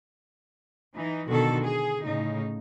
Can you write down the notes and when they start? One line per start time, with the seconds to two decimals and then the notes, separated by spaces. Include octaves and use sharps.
0.94 E3 D#4
1.28 B2 D3 D#3 F#4 A4
1.63 G#4
2.03 A2 C#3 D#4